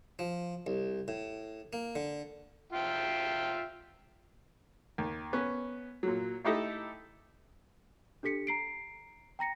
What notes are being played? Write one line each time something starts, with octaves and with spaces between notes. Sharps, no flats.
F3
C2
A2
A#3
D3
F4 E5 G5
D#2
B3 C#4
A#2 F#3
A3 D#4 E4 G4 A4 D#5
D4 G4 A4 B6 C#7
A#5 C7 D7
G5 A#5 A#6 C#7